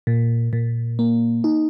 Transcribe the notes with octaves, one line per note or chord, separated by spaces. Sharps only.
A#2
A#2
A#3
D#4